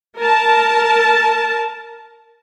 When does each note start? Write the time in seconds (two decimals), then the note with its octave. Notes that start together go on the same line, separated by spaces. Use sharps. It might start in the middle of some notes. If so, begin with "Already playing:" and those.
0.18 A#4 A5